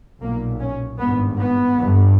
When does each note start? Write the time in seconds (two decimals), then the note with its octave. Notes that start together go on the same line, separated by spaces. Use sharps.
0.22 B1 A#2 A#3
0.60 C#4
0.99 G#1 G2 B3
1.37 B3
1.77 G1 G2